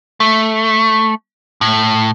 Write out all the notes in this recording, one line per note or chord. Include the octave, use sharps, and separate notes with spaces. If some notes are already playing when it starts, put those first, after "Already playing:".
A3
A2